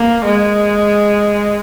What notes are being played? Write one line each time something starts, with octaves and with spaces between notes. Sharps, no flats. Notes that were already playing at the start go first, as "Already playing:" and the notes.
Already playing: A#3
G#3